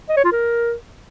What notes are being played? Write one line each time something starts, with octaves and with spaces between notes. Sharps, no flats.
D#5
C#5
F4
A#4